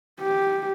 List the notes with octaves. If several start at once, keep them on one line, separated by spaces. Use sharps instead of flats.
G4